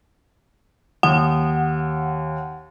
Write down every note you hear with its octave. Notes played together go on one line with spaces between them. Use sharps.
D#2 F#5